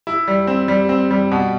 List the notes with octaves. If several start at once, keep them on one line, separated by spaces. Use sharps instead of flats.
E4
G3
C4
G3
C4
G3
B2